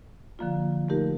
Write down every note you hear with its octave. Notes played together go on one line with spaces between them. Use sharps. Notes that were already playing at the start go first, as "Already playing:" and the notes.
D3 F3 A#3 F4
A3 D#4 G4 A#4